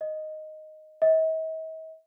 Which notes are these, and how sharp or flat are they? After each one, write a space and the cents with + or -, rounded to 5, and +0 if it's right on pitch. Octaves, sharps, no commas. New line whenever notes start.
D#5 -5
D#5 +45